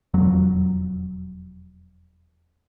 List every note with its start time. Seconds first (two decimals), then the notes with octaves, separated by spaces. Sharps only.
0.14 E1 F2 F#3